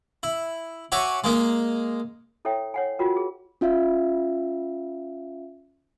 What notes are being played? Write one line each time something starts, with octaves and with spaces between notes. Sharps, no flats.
E4
F#4 C#5 E5 G#5 C#6 D6
G#3 A#3 D#4
E4 A4 C#5 E5 G5
C#5 F#5 G#5
F4 F#4 A#4 G5
G#4
C#4 F4 E5 F5